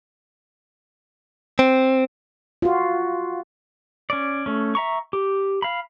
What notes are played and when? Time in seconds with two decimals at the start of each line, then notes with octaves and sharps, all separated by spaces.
1.59 C4
2.62 F4 F#4
4.10 C#4 D5
4.46 A3 C#4
4.75 E5 A#5 C#6
5.13 G4
5.62 F5 B5